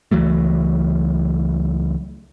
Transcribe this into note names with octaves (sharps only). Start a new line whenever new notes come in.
C#2 E3 F#3 A3